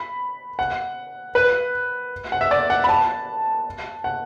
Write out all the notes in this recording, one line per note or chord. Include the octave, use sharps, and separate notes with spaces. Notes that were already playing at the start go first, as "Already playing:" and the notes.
Already playing: B5
F#5
B4
F#5
E5
D5
F#5
B5
A5
F#5